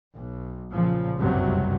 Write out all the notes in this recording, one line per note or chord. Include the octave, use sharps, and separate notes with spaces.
B1
A#2 C#3 F3
F#1 C#2 G2 C3 F#3